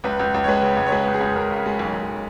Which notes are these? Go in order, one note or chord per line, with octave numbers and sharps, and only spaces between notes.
C#2 B4
C#2
C#2
C#5
G#3 B4
C#3
C#2
C#5
G#3 B4
C#2
G#4
C#2
C#2 A#4
C#3
G#3
B1
B1